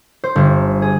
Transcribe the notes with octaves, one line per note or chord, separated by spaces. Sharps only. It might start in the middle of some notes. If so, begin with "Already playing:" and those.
C5
G1
G#4